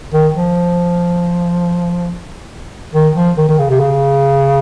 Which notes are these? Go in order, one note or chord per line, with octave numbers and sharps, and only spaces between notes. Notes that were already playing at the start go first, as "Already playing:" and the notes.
D#3
F3
D#3
F3
D#3
D#3
C#3
C3
C#3